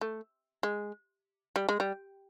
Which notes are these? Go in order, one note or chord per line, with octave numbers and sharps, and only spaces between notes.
A3
G#3
G3
G#3
G3